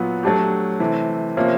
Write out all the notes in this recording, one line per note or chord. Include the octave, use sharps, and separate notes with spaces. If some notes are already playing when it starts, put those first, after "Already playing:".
Already playing: A#2 F#3 B3
F#3 A3 D4 G4
C3 E3 A3
C3 F3 A#3 C#4